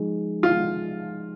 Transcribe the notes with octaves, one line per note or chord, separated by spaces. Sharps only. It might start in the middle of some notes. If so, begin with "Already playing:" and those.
Already playing: F3 G#3 D#4 G#4
F4